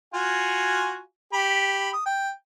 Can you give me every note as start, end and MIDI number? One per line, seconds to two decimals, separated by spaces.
0.14 1.00 65
0.14 1.00 66
0.14 1.00 80
1.33 1.91 67
1.33 1.91 83
1.93 2.03 87
2.06 2.31 79